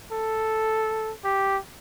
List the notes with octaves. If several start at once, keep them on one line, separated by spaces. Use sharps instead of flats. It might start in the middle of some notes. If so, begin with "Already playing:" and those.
A4
G4